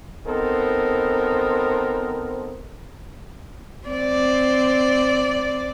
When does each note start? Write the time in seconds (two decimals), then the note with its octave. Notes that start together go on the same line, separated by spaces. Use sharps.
0.27 B3 C4 D#4 A4 A#4 C5
3.88 C4 D5